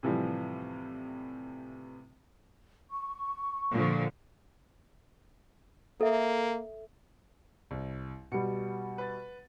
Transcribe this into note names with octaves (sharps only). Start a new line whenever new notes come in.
A2 C3 E3 F3 G3
C#6
A#2 D3 F3
A#3 A4 E5
C2
B2 G3 C#7
B4 A6